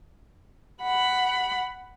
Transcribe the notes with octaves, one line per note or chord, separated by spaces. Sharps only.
F#5 B5